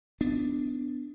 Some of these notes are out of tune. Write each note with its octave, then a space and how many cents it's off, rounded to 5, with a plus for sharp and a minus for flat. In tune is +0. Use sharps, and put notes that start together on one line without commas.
B3 +20 D4 +0